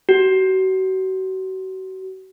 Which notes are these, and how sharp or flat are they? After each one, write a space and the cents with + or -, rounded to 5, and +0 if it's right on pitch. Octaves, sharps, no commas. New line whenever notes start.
F#4 +35